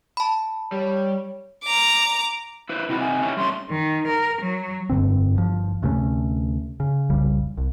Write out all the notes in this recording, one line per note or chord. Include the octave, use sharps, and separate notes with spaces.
A5 B5
G3 C#5
A#5 D6
E4 B4 C5
C3 D#3 E4 F#4
G#5
C#4 E4 G4
G3 A3 C#4 C6
D#3
A#4
F#3
F1 G2 D3 C4
G1 F3
D2 C3 A3 C#4
C#3
F1 C2 C#3 G3
C2